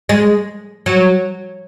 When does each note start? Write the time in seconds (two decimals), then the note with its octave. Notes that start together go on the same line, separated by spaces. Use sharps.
0.09 G#3
0.86 F#3